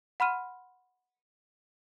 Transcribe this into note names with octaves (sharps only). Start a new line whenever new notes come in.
F#5 B5 C6 F6 D#7